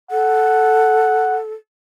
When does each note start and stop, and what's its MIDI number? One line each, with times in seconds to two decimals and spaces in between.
0.11 1.53 69
0.11 1.38 78